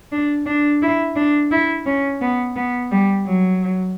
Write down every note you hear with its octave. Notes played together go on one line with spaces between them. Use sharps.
D4
D4
E4
D4
E4
C#4
B3
B3
G3
F#3